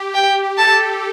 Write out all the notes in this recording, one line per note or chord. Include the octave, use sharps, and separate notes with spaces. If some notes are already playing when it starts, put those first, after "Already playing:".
Already playing: G4
G5
A4 A5